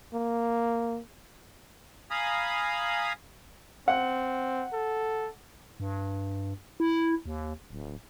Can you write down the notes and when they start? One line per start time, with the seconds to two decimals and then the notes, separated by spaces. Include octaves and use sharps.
0.13 A#3
2.11 F5 G#5 A#5 B5 D#6
3.88 C4 F#5
4.73 A4
5.80 G2
6.80 E4
7.26 D#2
7.70 D1